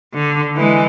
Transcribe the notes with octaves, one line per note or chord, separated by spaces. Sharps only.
D3
E3 G#3